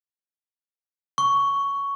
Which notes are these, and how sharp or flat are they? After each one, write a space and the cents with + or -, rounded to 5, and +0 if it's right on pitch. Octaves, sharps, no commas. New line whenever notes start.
C#6 +10